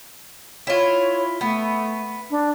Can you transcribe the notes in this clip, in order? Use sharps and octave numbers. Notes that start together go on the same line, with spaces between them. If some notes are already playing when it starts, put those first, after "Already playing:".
E4 F4 C#5
A3 B3
D4